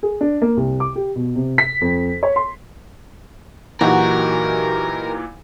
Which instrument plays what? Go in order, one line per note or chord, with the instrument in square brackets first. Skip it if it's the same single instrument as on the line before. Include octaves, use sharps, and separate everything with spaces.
[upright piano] G#4
D4
A#3
C2
D6
G4
B2
C3
B6
F2
C#5
C6
[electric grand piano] A#2 E3 [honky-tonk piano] F#3 D#4 G4 [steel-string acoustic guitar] F#4 [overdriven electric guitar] A#4